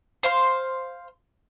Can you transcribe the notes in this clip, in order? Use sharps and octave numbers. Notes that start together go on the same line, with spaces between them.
C5 F5 C6